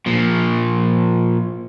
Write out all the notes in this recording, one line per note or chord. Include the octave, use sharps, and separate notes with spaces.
A#2 F3